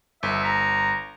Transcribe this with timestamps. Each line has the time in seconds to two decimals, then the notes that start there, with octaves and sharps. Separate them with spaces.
0.23 G1 E5
0.44 A#5